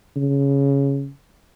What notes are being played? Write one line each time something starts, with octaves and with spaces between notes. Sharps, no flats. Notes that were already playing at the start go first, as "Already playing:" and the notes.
C#3